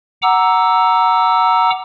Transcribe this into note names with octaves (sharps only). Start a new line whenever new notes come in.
F#5 A#5 D6 E6